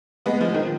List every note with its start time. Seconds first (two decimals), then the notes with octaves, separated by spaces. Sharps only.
0.26 G#3 B3
0.40 F3 G#3
0.54 D#3